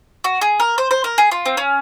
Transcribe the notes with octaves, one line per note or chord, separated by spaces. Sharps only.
F#4
G#4
A#4
C5
C5
A#4
G#4
F4
C4
C#4